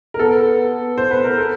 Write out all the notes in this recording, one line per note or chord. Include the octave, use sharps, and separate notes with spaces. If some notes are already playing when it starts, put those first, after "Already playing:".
A#4
B3 A4
B3
C5
B3 B4
A#4
A4